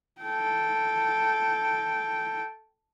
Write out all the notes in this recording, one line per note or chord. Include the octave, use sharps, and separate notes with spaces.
A4 G5